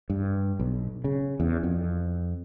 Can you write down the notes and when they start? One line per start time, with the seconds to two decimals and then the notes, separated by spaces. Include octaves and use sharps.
0.10 G2
0.59 B1
1.04 C#3
1.40 E2
1.63 F2